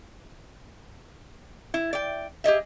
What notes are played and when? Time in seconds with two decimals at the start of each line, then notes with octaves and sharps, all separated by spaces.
1.74 E4
1.93 D5 G5
2.44 G4 G#4 D#5 E5